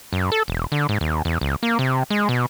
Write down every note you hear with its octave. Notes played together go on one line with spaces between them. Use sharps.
F#2
A4
E1
D3
G#2
D#2
E2
C#2
A#3
C3
G#3
B2